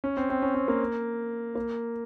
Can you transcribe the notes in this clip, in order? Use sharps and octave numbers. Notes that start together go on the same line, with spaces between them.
C#4
C4
C4
C#4
C4
A#3
A#3